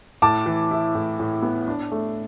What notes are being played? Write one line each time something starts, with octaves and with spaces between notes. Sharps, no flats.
A2 A5 D6
E3
E4
A2
A2
B3
D4
A3